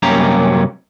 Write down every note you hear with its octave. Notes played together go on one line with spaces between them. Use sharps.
C2 F#2 A#3 C#4 G4 A#5